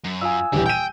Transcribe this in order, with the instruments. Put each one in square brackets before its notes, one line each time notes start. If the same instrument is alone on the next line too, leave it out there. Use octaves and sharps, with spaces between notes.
[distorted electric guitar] F#2
[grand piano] F4 [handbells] G#5 D#6 E6
[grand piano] D#1 E3 G4 [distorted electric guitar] D3 D4
[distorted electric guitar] G5 [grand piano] G6 D#7